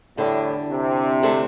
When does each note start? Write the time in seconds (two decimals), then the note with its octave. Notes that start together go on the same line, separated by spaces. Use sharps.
0.17 E2 A2 D3 G3 D4
0.70 C3
1.23 D3 A3 C4